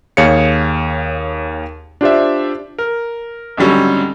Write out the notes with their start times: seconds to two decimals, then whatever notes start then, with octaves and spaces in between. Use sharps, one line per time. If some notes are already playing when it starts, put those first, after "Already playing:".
0.17 D#2 G#4 C#5 F5 C#7
2.01 D4 F4 G4 C5 D5 E5
2.78 A#4
3.57 G#1 D3 F#3 G3 C#4